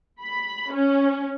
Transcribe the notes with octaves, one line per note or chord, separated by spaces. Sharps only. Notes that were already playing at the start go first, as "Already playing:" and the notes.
B5
C#4